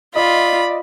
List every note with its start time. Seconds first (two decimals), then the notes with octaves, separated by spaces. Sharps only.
0.15 F4 D5 D#5 B5